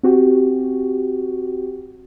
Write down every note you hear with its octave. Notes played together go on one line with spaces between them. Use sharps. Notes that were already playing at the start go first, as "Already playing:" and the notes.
C4 F#4 G4